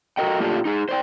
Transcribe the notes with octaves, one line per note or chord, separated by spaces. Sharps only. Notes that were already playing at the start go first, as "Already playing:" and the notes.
F#4 A4 A#4 D#5 G5
A2 A#3 D4 F4 G4 A4
D#4 G#4
C5 D5 G5